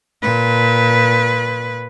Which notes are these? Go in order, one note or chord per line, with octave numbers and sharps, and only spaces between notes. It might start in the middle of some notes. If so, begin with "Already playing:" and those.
A#2 B4